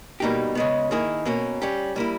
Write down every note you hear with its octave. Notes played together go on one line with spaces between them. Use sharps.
B2 G3 A#3 D#4 G4
C#3 G#3 B3
D#3 A#3 E4 G#4
B2 A#3 C#4
G3 C#4 G4
G3 A#3 E4